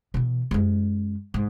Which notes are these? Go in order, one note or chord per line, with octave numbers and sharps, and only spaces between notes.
B2 E3
F#2 G#3
G#2